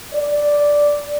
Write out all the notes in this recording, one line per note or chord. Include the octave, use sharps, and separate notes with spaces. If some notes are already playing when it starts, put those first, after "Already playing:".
D5